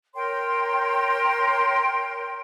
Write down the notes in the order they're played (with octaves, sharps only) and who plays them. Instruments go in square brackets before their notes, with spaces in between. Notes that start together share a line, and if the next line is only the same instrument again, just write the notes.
[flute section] A#4 C#5 G5 C6